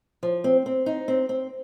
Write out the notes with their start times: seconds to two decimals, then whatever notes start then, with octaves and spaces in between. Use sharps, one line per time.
0.23 F3
0.44 C4
0.66 C4
0.86 D#4
1.08 C4
1.29 C4